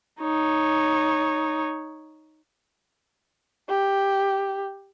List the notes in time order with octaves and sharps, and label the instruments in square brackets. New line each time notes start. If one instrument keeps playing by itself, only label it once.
[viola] D#4 C#5
[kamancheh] G4